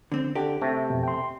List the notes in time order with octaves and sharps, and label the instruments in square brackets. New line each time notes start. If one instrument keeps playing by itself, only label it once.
[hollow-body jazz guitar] D3 C4
[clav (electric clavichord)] D3 [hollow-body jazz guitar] G4
[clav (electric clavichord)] C3 A3
[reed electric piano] F2 B2
G5 C6